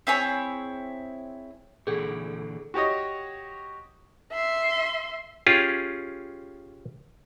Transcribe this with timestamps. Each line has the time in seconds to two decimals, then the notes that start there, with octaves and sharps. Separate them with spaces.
0.07 C4 E4 G#4 C#5
1.87 A#2 D3 E3 G#4 A4
2.74 F#4 G4 C#5 D#5
4.32 E5 C6
5.47 C#4 F4 G4 G#4